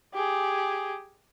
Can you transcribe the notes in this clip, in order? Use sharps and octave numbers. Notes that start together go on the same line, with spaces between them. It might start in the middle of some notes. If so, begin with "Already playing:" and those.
G4 G#4